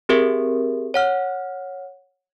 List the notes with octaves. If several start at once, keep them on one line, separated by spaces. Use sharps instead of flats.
C4 G4 G#4 A#4 E5
C#5 F#5 F6